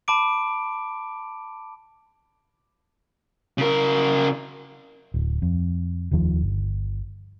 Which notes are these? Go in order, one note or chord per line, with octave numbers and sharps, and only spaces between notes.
A5 B5 D6 D7
C#3 A#4
D1
F2
F1 D#2 D#3 F3
G1